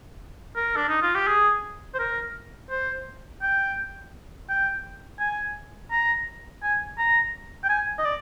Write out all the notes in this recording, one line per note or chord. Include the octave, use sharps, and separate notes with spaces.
A#4
D4
D#4
F4
G4
G#4
C5
A#4
C5
G5
G5
G#5
A#5
G#5
A#5
G5
G#5
D#5
D5